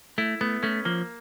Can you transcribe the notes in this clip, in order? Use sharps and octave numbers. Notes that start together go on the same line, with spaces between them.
A3 E4
A3 B3
A3 C#4
F3 A#3